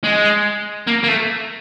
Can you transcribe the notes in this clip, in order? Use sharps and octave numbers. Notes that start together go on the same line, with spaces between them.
G#3
A#3
A#3
A3